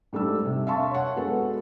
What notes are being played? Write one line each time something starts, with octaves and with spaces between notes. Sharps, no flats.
G#2 G3 A3 D4 E6
C3
E5 F5 A5 C6 C#6
C#5 F#5
G#3 B3 F#4 A4 B4